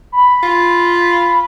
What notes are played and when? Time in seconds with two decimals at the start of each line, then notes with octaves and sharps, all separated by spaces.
0.12 B5
0.43 F4